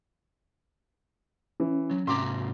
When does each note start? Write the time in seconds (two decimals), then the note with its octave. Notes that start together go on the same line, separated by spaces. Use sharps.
1.60 E3 C#4
1.91 F#3
2.07 G#2 C3 A#5 C6 D6